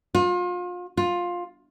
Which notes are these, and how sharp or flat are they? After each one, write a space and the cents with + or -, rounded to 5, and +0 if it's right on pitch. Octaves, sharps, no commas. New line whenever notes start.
F4 +35
F4 +15